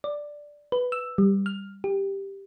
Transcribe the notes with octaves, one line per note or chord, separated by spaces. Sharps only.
D5
B4
E6
G3
F6
G4